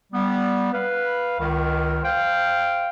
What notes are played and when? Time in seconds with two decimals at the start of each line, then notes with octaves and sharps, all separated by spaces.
0.13 G3 B3
0.73 B4 F5
1.39 C#2 D#3
2.03 C5 F5 G5